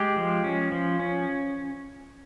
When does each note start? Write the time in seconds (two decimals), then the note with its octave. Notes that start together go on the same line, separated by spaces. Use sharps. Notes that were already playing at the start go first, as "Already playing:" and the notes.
Already playing: G#3 G4
0.16 F3
0.44 C#4
0.72 F3
1.00 C#4